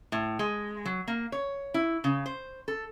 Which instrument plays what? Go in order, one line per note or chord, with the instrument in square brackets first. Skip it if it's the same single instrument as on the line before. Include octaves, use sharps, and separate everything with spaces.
[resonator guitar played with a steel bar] A2
G#3
F#3
A#3
C#5
E4
C#3
C5
A4